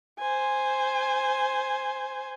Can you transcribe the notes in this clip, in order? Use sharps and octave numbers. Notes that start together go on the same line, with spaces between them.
C5 G#5